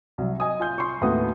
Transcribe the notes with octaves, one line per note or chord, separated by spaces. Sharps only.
C2 F#3
D#5 G#5 D#6
F4 G#5 G6
C6 C#6
D#2 A2 B3 F#4 D#6